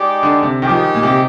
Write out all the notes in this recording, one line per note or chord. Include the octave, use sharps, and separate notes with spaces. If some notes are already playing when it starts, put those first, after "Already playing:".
Already playing: G#3 D#4 G4 D5
D3
C3
D#3 G#3 D#4 G4
F3
D#3
A#2
C3